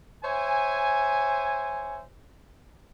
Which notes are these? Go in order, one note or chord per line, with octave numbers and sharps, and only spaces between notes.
C5 C#5 E5 G#5